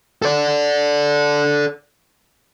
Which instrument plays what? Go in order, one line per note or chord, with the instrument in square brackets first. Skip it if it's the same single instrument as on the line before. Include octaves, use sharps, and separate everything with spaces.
[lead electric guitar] A4 D5